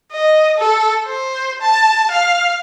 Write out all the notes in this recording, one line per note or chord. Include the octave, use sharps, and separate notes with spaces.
D#5
A4
C5
A5
F5